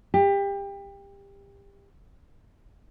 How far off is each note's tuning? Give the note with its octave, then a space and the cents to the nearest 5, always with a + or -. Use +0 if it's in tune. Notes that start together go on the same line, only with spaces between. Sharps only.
G4 +25